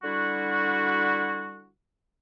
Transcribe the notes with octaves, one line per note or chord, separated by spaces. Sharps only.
D3 G3 E4 F#4